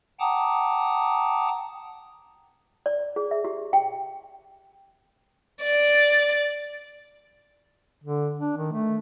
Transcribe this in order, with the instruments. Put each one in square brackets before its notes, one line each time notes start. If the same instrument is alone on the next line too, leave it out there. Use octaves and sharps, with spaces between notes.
[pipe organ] F#5 G5 A5 A#5 D6 D#6
[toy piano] D5
G#4
E5
G4
G5
[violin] D5
[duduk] D3
D4
D#3
A3